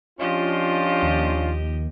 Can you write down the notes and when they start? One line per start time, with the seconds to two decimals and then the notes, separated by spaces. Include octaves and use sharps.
0.19 F3 C#4 D4 F4 G4 D#5
1.03 D#2